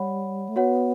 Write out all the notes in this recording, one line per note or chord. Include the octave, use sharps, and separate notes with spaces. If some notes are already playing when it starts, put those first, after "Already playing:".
Already playing: G3 C#5 F#5 B5
A3
B3 F#4 C#5 F#5